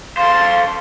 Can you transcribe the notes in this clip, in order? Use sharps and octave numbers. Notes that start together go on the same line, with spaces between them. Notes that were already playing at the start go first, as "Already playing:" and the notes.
A4 C5 F5 C6